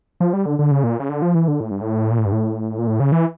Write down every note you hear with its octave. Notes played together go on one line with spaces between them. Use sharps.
F3
G3
D3
D3
C#3
A#2
C#3
D3
F3
E3
D3
A2
G2
A2
A#2
A2
G2
A2
A#2
A2
C#3
E3